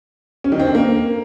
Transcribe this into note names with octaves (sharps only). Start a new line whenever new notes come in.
C#4
D#3
C4
D4
A#3